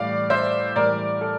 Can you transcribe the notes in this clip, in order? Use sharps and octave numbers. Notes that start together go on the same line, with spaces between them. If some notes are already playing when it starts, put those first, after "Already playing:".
Already playing: A2 E3 G3 D5 F5
C5 E5
A2 E3 G3 A#4 D5
A4